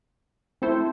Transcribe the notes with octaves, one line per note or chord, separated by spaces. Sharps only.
A3 C4 E4 A4 C5